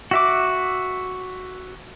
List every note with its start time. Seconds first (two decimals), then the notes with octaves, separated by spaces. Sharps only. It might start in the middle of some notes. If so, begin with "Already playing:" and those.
0.11 F#4 E5 D6